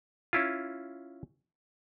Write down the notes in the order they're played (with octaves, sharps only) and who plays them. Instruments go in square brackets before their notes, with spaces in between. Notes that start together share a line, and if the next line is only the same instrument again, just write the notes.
[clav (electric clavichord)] C#4 E4 F4